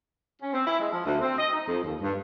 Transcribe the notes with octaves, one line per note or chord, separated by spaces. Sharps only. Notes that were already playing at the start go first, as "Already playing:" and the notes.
C#4
C4
E4
G#3
F3
D2
C4
D#5
D#4
F2
D#2
G2